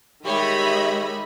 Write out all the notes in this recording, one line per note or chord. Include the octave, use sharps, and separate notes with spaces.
D#3 G3 G#3 C#5 D#5 E5 B5